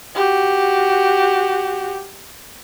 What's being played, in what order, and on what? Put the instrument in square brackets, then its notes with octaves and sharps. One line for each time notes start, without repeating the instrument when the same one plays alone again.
[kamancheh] F#4 G4